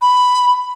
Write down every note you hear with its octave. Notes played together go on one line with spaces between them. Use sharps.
B5